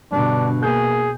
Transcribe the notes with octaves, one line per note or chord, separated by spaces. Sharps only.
G2 B2 D3 D4
A#3 G#4 G6